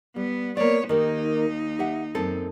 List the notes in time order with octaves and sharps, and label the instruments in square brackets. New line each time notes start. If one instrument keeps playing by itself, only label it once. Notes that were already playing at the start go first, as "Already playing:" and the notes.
[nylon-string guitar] G3 [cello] B3
[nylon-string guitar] A#3 D5 [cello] B3 C#5
[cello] D#2 D#4 [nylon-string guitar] D#3 A#3 G4
[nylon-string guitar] G4 E5 F#5
F#2 C4 A4